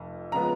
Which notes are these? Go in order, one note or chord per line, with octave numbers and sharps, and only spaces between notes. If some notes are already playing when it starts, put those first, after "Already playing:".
Already playing: F1 F2
C#3 F3 G#3 B3 A#5